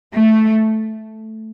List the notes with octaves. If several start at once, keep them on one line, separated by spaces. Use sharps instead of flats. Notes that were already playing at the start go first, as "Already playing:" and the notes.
A3